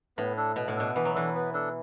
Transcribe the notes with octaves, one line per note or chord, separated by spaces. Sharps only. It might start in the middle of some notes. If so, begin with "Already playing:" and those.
A2 B3
D4 A4
B2 B3
A2
B2 D4 A4
E3 B3
F#3
E3 D4 A4
B3
D4 A4